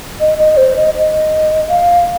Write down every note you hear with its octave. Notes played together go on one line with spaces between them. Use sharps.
D#5
D#5
C5
D#5
D#5
F5